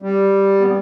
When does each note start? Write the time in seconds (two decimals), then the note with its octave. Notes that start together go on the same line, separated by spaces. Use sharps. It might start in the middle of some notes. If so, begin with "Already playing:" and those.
0.02 G3
0.61 B3